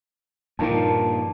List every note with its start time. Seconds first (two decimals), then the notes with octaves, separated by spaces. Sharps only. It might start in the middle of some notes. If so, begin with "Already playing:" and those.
0.59 G2 A#2 D#3 F3 A#3 A5